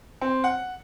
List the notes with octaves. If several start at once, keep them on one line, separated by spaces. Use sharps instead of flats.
C4
F#5